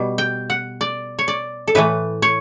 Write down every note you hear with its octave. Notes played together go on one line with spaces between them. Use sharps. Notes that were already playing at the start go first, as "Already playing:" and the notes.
Already playing: B2 G3
G5
F#5
D5
C#5
D5
A4
A2 E3 A3 B4
C#5